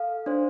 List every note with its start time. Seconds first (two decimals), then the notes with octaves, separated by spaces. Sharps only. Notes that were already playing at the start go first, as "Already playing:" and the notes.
Already playing: A4 F5
0.26 D4 C5